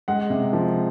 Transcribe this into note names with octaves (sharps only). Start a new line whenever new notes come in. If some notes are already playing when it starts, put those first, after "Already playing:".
G#3 F#5
C3
F3